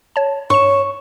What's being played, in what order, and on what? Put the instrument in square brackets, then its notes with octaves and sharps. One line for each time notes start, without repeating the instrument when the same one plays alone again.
[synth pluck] C#5 A5
[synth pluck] G2 E7 [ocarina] C#5 [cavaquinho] C#6